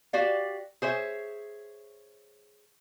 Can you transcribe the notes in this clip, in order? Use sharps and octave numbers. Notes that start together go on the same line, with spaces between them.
F#4 G4 D5 F5
G#4 C5 C#5 E5